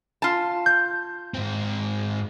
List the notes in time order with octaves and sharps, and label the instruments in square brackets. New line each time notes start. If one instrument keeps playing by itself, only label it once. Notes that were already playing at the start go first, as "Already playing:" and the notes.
[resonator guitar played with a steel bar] F4 A5
[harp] G6
[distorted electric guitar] G#2 C4